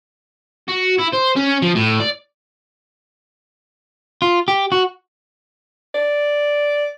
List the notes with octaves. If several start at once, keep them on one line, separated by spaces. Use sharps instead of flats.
F#4
E4
C5
C#4
F3
A2
D5
F4
G4
F#4
D5